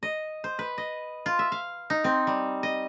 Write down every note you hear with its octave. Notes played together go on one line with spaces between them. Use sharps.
D#5
C5
B4
D#5
F4
E5
F5
D#4
C4
G3
D#5